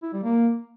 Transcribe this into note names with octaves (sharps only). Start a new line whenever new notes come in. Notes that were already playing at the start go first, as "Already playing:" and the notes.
E4
G3
A#3